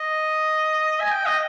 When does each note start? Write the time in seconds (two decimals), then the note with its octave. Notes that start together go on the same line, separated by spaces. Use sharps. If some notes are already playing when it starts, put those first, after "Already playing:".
Already playing: D#5
1.00 G#5
1.11 G5
1.26 D#5